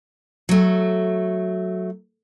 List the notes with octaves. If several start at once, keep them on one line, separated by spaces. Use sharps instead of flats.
F#3 A3